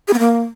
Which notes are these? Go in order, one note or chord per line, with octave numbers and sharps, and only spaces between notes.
G#4
B3
A#3